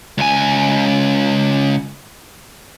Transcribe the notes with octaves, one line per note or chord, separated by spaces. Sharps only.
C#2 G#5